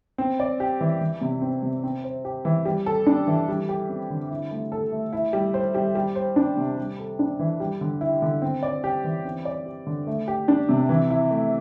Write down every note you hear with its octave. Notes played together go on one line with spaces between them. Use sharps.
C4
D5
G4
E3
E3
C3
C4
C3
C4
C5
G4
E3
G3
A4
D4
E3
G3
G4
C4
D3
E4
A3
A4
A3
E4
G3
C5
G3
G3
C5
D4
C3
G3
A4
D4
E3
G3
D3
E4
D3
C4
D5
G4
E3
C4
D5
G4
D3
A3
G4
D4
C3
E3
E4
A3